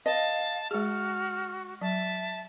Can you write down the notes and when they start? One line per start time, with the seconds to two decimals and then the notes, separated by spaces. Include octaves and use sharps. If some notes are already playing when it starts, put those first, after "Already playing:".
0.06 D#5 F5 A5
0.71 G#3 F#4 G#4 F6
1.81 F#3 E5 A5